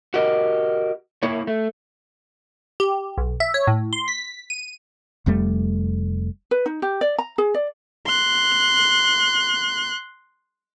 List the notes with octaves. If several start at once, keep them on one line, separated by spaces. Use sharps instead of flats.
F#4 G4 A#4 D#5
A#3 E4 C#5
A3
G4
B1
E5
C#5
A2
C6
B6
D#7
F1 F2 G3 A3
B4
D#4
G4
D5
A#5
G#4
D5
C6 F#6